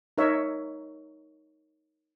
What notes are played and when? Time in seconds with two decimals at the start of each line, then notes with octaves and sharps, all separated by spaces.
0.18 D#4 A#4 C#5 E5